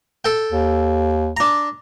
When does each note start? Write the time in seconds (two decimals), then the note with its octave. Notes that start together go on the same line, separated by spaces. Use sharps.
0.25 A4 G5
0.52 D#2
1.37 D4 A#5